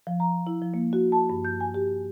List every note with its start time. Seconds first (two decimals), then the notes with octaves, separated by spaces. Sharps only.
0.07 F3
0.20 A#5
0.47 E4
0.62 F3
0.74 A#3
0.93 F#4
1.12 A5
1.30 G2
1.45 G6
1.61 G#5
1.74 G4